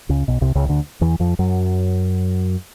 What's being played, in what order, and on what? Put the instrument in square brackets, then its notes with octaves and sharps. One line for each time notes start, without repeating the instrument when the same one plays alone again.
[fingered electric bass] C#2 C#3
B1 B2
C2 C3
C#2 C#3
D2 D3
E2 E3
F2 F3
F#2 F#3